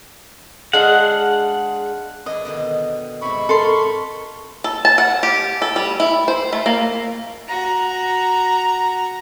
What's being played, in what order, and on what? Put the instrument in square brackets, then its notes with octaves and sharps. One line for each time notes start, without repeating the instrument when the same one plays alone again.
[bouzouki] G#3 D4 F5 [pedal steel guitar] F#5
[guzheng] E3 D4 E4 [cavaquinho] D#5
[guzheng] B2 D3 D#3
[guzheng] G#2 C3 [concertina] B5 C#6
[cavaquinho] A4 A#4 C6
[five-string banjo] A4
A5
F#5
G4
A4
G3
E4
C5
A3
A#3
[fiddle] F#4 A#5